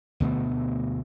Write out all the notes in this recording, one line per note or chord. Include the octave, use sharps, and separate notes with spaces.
D2 B2 A3 B3